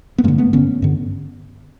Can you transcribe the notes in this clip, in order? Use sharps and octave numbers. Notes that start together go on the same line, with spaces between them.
B3
G2 D3 G#3 A#3
A3 B3
G2 D3 B3 C#4
G2 D3